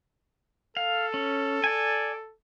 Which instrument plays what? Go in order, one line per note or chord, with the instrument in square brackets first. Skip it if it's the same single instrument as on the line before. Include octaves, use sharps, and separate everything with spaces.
[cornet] A4 [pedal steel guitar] F5
[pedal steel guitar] C#4
D5 G#5